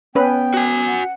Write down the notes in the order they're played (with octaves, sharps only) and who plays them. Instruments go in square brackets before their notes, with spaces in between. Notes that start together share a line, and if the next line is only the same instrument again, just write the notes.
[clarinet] B3 [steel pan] C#4 B4 [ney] G5
[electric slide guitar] F#4 G#5
[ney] F#5